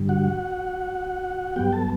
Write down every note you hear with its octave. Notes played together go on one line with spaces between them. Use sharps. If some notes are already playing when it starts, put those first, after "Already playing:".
Already playing: G2 D3 G3
F#4 F#5
G2 F#3 B3 G4 G5
A4 A5